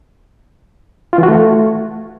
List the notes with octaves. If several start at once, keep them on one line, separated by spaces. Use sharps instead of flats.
F4
E3
F#4
A3